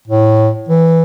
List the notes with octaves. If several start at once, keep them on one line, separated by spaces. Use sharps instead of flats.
A2
E3